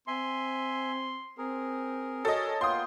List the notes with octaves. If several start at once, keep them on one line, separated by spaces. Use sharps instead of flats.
C4 E5 G#5 C6
C4 G#4 A#4
F#4 A4 C#5 D#5
A#3 B3 F4 G5 C6 D#6